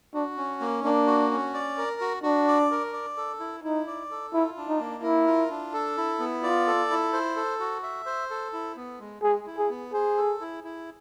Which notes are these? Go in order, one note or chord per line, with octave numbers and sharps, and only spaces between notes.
D4 F#4
C#4
A#3
A#3 D4
F#4
C#4
D5
A#4
F#4
D4 F#4
D5
A#4
D5
A4
E4
D#4 E4
D5
A4
E4 F4
D4
D#4
A#3
E4 A#4
F4
D4
A4
E4
B3
F4 D5
A4
E4
C5
A4
F#4
E5
C5
A4
E4
B3
G#3
G#3 G#4
E4
G#4
B3
G#4 C5
A4
E4
E4